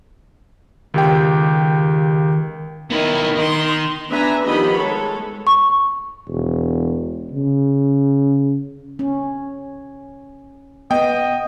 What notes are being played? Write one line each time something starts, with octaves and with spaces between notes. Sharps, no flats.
C#2 D#3 G4 G5
D#3 B3 D#4 E4
D#3 D#5 C6
B3 D4 B4 E5 G#5 A#5
D#3 F3 B3 G4 D#5 B5
G#3 A4 C#5
C#6
E1
C#3
C#4
B3 D#5 G5